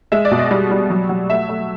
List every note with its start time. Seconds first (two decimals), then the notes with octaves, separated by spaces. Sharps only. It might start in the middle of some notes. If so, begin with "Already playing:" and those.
0.12 G#3 E5
0.25 D5
0.31 B2
0.39 D#5
0.51 G3
0.71 G3
0.90 F#3
1.09 F#3
1.29 A3 E5
1.49 A3